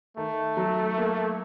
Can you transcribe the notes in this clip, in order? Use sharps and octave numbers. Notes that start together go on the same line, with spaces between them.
D#3 A3
F#3
A#3